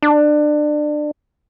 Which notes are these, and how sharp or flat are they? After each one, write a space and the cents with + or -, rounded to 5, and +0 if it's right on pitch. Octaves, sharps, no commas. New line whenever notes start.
D4 +25